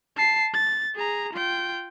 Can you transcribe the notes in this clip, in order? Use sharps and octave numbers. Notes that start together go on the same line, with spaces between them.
A5 C7
A6
G#4 A#5
F4 G5